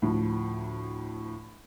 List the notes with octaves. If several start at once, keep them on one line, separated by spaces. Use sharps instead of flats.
D2 A2 F3